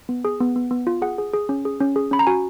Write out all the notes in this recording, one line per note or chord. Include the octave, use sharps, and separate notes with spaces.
B3
G#4
B3
B3
B3
F4
G#4 F#5
G#4
G#4
C#4
G#4
C#4
G#4
C#4 B5
A#5
F#4 G#5